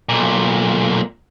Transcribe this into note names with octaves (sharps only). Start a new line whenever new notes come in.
B1 A#2